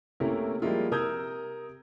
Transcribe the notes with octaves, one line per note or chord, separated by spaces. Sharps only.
C3 A3 A#3 C#4 E4 A#4
F3 G3 G#3 A#3 E4 F4
C3 A#4 D#6 E6 G6 G#6